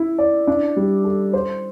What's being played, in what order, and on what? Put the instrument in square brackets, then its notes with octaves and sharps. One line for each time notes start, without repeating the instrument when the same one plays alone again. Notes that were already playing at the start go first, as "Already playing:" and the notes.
Already playing: [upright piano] E4
D5
D4
G3
A4
C5